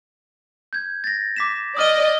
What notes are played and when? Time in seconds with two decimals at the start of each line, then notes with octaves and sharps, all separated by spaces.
0.73 G6 G#6
1.04 A6 A#6
1.36 D6 B6 E7
1.77 D5 D#5 D#6 F6 D#7